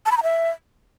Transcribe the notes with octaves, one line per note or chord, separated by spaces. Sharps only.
A5
B5
A#5
E5